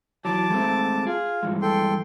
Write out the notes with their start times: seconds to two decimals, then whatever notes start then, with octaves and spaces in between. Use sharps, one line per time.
0.25 E3 F#3 A5 D6
0.50 G#3 A3 C4
1.07 F4 G#4
1.43 G2 E3 G#3
1.62 A4 G5 C6